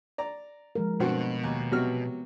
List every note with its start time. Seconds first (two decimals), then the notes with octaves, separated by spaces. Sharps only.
0.18 D5 A#5
0.75 F3 G#3 A#4
1.00 G2 B2 C4 F#4
1.43 D#2
1.72 C3 F#3 B3 F6